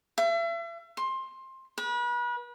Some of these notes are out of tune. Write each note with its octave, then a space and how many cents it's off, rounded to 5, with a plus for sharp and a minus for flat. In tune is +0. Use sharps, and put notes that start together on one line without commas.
E5 +40
C6 +20
B4 -35